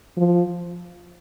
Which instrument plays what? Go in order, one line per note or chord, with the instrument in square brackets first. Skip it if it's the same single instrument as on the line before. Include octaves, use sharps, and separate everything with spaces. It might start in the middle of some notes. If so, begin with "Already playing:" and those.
[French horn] F3